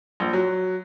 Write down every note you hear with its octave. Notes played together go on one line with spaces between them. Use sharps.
A#1
F#3